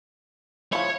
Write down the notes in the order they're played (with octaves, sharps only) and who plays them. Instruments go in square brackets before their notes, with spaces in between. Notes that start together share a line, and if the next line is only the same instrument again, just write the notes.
[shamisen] F3 E4 [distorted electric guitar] C#5